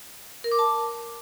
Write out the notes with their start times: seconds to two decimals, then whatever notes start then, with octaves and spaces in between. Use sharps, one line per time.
0.44 A#4
0.51 D6
0.59 A5